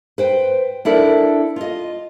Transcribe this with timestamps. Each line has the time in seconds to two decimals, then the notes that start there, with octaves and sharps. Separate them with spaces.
0.18 B4 C5 G5
0.85 D4 E4 A4 A#4 D5
1.56 F4 D#5